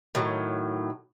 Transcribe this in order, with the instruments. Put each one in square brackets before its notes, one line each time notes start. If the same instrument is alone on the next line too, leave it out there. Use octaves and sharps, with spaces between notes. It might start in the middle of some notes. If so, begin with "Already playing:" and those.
[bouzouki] A2 D#3 F#3